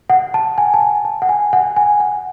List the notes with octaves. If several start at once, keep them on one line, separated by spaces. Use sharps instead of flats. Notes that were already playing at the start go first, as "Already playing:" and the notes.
F#5
A5
G#5
A5
G#5
A5
F#5
G#5
F#5
G#5
F#5